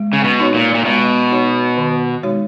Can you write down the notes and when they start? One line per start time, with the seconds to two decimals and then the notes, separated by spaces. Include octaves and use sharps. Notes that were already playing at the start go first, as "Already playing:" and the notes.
Already playing: G#3
0.13 C#3
0.24 B2
0.40 D#4 F#4 C#5
0.54 A#2
0.74 A#2
0.85 B2 G#3
1.31 D#4 F#4 C#5
1.77 D#3
2.23 G#3 D#4 F#4 C#5